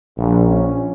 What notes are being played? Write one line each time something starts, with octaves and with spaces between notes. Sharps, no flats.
A#1
C#4